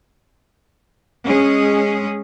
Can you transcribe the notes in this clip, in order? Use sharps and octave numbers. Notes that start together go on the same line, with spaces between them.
G#3 C#4 G#4